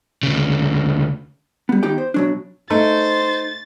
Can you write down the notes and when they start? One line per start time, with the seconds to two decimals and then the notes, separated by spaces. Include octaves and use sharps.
0.23 D2 C#3
1.69 G3 B3
1.83 D#3 B3 D#4 G4 G5
1.98 C5
2.14 B2 F#3 D4
2.70 A3 D#4 C5 A6